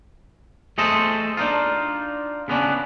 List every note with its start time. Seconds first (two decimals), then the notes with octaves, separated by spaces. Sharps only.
0.78 A3 G#4 A4 C5 D#5
1.37 D4 D#4 F4
2.48 C#3 B3 C#4 D4